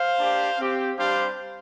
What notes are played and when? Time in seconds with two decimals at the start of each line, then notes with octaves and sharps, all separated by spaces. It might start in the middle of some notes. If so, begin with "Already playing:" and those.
Already playing: C5 F5
0.18 A#3 D4 G4
0.59 C4 G4
0.98 G3 D4 G4 C5 F5